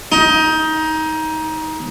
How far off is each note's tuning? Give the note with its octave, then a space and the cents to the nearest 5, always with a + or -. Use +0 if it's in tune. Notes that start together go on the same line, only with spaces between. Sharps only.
D#4 +20